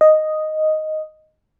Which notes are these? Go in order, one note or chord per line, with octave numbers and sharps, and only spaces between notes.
D#5